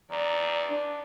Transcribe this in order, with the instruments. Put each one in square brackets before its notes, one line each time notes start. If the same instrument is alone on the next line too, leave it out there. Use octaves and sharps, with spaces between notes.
[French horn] E2 [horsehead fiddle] D5 [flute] A#5
[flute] D4